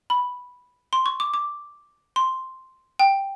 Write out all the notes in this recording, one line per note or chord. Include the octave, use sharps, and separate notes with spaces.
B5
C6
C#6
D6
D6
C6
G5